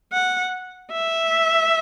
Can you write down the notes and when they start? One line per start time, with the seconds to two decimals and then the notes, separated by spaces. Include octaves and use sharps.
0.13 F#5
0.92 E5